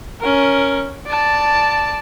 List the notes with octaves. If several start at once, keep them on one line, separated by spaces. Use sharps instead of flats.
C#4 A#4
D5 A5